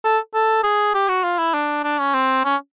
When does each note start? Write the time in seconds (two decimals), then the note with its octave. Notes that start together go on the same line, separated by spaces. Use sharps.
0.05 A4
0.35 A4
0.64 G#4
0.94 G4
1.09 F#4
1.24 F4
1.39 E4
1.54 D4
1.84 D4
1.99 C#4
2.14 C4
2.45 C#4